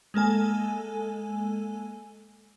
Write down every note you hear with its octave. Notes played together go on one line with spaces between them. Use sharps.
G#3 A#3 A4 G#5